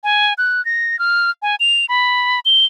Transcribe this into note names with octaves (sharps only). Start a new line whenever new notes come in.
G#5
F#6
A#6
F6
G#5
F7
B5
G7